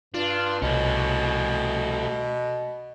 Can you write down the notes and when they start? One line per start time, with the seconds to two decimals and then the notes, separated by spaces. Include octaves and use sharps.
0.14 G2 D4 F4
0.62 C2 B2 A3 C#4